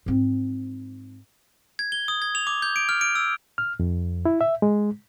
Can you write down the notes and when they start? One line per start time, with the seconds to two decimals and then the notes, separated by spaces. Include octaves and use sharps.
0.06 G#2 C4
1.79 G#6
1.92 G7
2.08 D#6
2.22 G#6
2.35 F7
2.47 D6
2.62 G6
2.76 D7
2.89 F6
3.01 D7
3.15 E6
3.58 F6
3.80 F2
4.25 E4
4.41 E5
4.62 G#3